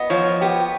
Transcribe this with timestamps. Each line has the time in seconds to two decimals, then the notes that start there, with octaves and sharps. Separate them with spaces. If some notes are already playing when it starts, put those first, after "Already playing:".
Already playing: B3 D#5
0.10 F3 C#5
0.41 B3 G4